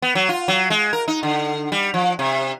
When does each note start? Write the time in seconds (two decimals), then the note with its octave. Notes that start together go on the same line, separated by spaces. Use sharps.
0.02 B3
0.15 F#3
0.29 F4
0.48 F#3
0.70 G#3
0.93 A#4
1.08 D#4
1.23 D3
1.72 G3
1.94 F3
2.19 C3